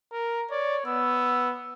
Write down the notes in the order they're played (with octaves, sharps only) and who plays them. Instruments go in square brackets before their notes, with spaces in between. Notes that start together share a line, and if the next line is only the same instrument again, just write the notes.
[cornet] A#4
[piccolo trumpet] C#5 [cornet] D5
[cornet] B3 [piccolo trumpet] E6